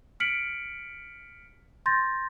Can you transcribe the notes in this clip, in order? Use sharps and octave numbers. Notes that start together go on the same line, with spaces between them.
F6 B6 C#7 D7 F#7
C6 G6 A6 A#6